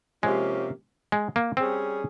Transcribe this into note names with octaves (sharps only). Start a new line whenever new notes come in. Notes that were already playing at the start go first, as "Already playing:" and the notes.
C3 F3 G#3 A#3 C#4 G4
G#3
A#3
G3 C4 C#4 G#4